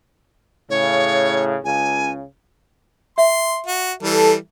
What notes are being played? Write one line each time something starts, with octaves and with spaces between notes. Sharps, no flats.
A2 C#3 C#5
C#2 C#3 G#5
E5 C6
F#4
E3 G3 A4